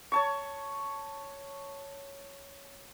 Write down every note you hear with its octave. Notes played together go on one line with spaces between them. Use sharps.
C#5 A5 C#6